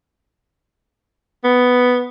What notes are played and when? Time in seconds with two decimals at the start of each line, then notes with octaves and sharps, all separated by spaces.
1.44 B3